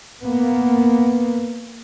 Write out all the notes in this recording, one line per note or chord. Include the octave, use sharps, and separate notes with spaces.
A#3 B3